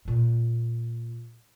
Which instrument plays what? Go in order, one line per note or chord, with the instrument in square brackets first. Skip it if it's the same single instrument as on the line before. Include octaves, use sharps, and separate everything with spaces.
[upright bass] A#2 A#3